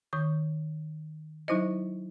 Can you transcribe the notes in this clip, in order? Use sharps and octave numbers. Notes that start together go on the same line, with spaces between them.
D#3 C#6 G6
F#3 D#4 E4 C5 D#5